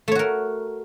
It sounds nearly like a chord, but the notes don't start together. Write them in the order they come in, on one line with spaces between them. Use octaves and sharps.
A3 C#5 F#4 A#4